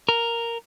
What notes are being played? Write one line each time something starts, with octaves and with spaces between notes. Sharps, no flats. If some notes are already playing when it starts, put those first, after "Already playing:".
A#4